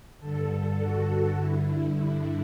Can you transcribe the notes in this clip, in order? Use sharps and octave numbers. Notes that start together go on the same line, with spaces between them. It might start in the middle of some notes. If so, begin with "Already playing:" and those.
G2 D3 A4
F#4
G2 D3 E4
E4